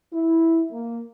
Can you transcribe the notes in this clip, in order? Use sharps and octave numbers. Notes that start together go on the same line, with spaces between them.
E4
A#3